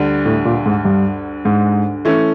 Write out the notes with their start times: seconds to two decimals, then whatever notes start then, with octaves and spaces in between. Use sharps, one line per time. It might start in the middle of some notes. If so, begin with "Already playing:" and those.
Already playing: D2 D3 G3
0.26 A2
0.45 A#2
0.66 G#2
0.85 G2
1.45 G#2
2.05 E3 A3 C#4